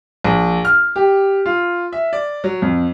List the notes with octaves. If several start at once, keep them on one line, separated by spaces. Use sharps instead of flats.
A#1
F6
G4
F4
E5
D5
F#3
F2